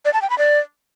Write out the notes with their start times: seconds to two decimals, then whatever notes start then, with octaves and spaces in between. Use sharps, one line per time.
0.05 D5
0.13 A5
0.22 G5
0.30 B5
0.38 D5